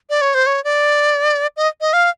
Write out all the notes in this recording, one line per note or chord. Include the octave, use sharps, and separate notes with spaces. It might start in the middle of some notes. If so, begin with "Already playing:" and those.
D5
C#5
C5
C#5
D5
D#5
D#5
F5